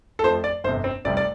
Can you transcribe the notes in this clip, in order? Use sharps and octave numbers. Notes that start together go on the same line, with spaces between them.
A4
F2 F3 A3 C5
D5
G1 F2 C3 C5
C4
F1 F2 C3 G3 D5
D5